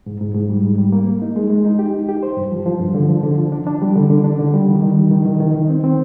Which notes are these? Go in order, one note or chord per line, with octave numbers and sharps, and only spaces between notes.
G#2
G#2
G#2
G3
G#2
G3
A#3
A#3
D#4
G#3
G#3
D#4
G4
D#4
G4
C5
G2
F3
F3
G2
D3
F3
D3
F3
D4
D4
G3
D3
D3
D4
D3
G3
D#3
D#3
G3
D#3
D#3
D#3
D#3
C4
C4